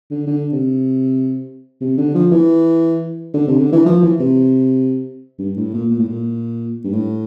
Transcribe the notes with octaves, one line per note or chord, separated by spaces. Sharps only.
D3
D3
C3
C3
D3
F3
E3
D3
C3
D3
E3
F3
E3
C3
G2
A2
A#2
A#2
A2
A#2
G2
A2